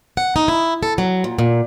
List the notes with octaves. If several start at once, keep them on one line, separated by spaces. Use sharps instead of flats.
F#5
D#4
E4
A4
F#3
A#2
A#2